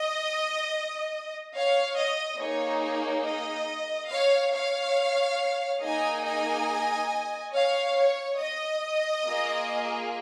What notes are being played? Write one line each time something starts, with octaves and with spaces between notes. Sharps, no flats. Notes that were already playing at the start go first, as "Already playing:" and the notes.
Already playing: D#5
C#5 F5
D#5
A#3 D#4 G#4 C#5
C#5
D#5
C#5 F5
C#5 F5
A#3 D#4 G#4 D#5 G#5
D#5 G#5
C#5 F5
C#5
D#5
A#3 F4 G#4